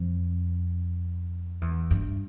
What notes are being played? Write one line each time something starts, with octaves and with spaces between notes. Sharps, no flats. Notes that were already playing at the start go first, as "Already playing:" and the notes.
Already playing: F2
E2
G2